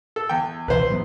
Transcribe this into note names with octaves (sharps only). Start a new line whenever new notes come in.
A4
E2 G5
C#2 B2 E3 B4 C5
A2 F#3 B3